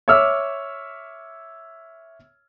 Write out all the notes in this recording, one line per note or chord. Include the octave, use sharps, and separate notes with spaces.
C#5 E5 D6 E6 F6